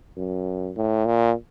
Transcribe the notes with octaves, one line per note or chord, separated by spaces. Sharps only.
F#2
A2
A#2